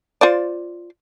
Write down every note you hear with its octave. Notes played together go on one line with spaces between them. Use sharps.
F4 C5 D5